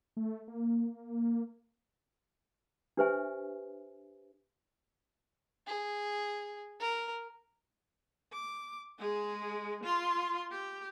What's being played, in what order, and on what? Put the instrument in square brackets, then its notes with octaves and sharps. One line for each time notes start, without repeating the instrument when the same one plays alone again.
[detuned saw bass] A3
A#3
[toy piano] D4 G4 B4 C5 E5 G#5
[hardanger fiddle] G#4
A#4
[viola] D6
G#3 G#4
F4 C6
G4